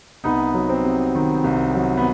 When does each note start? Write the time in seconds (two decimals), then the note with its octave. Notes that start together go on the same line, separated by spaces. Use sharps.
0.24 C2 B3 D#4
0.54 F#3
0.69 C4
0.84 C3
1.15 D#3
1.44 C2
1.75 F#3
1.97 B3